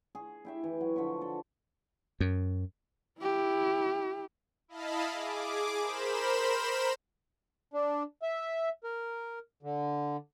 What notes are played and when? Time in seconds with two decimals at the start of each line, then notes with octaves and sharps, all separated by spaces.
0.15 G#4
0.45 E4 G4 E5
0.64 E3
0.81 F#3
0.96 D3 F3 B5 C#6
1.21 A4
2.20 F#2
3.20 E4 G4
4.68 E4 D#5 F5 A5 B5
5.12 G#4 D6
5.81 A#4 C5 B5 E7
7.74 D4
8.22 E5
8.84 A#4
9.63 D3